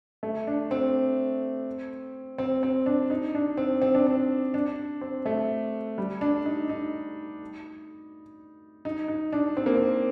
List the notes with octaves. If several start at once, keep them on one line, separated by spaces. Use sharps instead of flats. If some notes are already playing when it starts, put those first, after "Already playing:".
A3
D4
C4
C4
C4
D4
D#4
D4
C4
C4
D4
C4
D4
C4
A3
G3
D4
D#4
D#4
D#4
D#4
D4
C4
A#3
C4